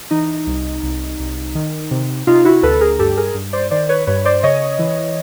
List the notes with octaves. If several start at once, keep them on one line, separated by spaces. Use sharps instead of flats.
E3 D#4
C2
C2
C2
D#3
C3
C3 D#4 F4
E4 F#4
D2 A4 B4
G#4 A#4
G2 G4 A4
G#4 A#4
G2
C5 D5
D#3 C5 D5
B4 C#5
G2 B4 C#5
C5 D5
C#3 C#5 D#5
E3